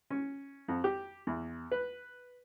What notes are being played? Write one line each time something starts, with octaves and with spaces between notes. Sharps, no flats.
C#4
F2
G4
E2
B4